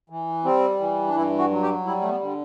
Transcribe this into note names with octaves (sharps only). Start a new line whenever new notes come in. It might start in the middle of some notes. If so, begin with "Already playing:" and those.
E3
G3 C4
E3
D4
G2 E4
F#4
F#3
G4
G3 E4
A3
B3
D3